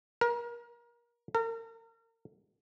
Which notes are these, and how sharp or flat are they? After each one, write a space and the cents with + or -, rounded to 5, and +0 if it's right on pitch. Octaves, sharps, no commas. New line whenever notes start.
A#4 +30
A#4 -35